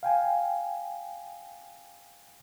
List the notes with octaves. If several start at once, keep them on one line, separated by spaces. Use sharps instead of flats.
F5 G5 G#5